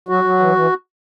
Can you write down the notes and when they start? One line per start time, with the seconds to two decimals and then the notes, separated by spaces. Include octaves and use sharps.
0.09 F#3 F#4
0.24 F#3
0.40 E3
0.55 E3